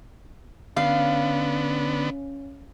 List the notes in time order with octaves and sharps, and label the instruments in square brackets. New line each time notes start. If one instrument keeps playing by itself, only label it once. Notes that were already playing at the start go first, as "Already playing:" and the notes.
[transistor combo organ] D3 B3 [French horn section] C#4 [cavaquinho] F5